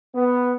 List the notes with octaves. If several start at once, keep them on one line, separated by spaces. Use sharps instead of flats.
B3